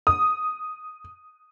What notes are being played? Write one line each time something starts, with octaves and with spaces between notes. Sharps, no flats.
D#6